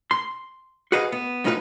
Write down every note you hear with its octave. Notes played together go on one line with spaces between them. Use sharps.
C6
F#4 G#4 B4 D#5 F5
B3
F#2 A2 D#4 F4 A4 B4